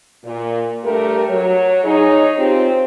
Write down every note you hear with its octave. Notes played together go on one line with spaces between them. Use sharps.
A#2
G2 A3 G4 A#4
F#3 C#5
D#4 G#4 C#5
C4 F4 G4